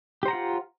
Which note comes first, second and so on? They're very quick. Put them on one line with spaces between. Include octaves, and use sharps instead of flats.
G4 C5 A#5 F#5 F4